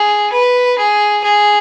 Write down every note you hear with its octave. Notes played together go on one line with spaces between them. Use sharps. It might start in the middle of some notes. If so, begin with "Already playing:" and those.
Already playing: G#4
B4
G#4
G#4